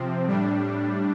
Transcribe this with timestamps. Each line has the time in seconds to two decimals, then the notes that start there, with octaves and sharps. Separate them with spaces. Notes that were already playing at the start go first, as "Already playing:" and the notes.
Already playing: C3 F3 C4
0.25 A2 G3 D4